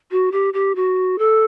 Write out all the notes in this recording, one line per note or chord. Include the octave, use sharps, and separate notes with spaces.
F#4
G4
G4
F#4
A4